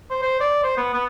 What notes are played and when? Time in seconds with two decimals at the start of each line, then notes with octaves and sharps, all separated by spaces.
0.10 C5
0.22 C5
0.40 D5
0.63 C5
0.77 B3
0.94 B3